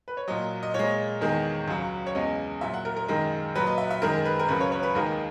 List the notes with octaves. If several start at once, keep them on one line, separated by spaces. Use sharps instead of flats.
B4
C#5
A#2 F#3 D#5
D#5
A#2 G#3 C#5
E2 D#3 G#3
C#2 C#3 F#3
C#5
E2 C#3 G#3 D#5
A#2 F#3 E5
F#5
A#4
A#4
F#2 D#3 G#3
A#2 F#3 B4
D#5
E5
E5
F#2 D#3 G#3 A#4
B4
A#4
C#2 C#3 F#3 B4
C#5
C#5
B4
D#2 D#3 G#3 A#4